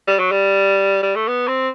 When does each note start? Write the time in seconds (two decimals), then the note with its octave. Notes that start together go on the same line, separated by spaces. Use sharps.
0.08 G3
0.19 F#3
0.32 G3
1.02 G3
1.15 A3
1.28 B3
1.48 C4